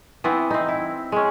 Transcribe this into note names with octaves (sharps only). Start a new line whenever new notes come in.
E3 B3 C4
C4 D#4
E4
G#3 C#4